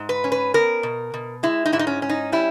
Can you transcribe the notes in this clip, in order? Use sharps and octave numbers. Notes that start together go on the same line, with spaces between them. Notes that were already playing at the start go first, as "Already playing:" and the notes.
Already playing: G#2
B4
C#4
B4
B3 A#4
B2
B2
G#3 E4
D#4
G#2 E4
D#4
C#4
C#4
D#4
G3 E4